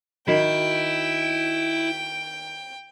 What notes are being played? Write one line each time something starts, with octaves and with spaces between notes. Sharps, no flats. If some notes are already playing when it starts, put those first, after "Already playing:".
D#3 E4 F#4 D#5 G5